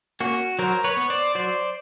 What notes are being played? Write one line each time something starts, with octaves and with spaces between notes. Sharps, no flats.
A#3 C#4 F#4
F#3 A#4 C5
B4 C#5
B3
C5 D5
F#3 C5 D5